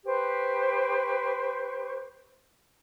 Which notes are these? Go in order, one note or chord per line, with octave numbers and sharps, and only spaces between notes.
G4 B4 C5 C#6